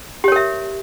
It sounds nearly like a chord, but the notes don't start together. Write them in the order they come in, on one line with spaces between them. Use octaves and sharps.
G4 C#5 A#4 E5